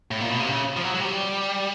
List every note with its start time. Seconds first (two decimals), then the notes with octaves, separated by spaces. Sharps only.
0.11 A2
0.21 A#2
0.30 B2
0.40 C3
0.50 C#3
0.77 F3
0.83 F#3
0.94 F#3
1.00 G3